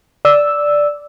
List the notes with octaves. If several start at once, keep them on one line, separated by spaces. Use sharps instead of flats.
D5 E6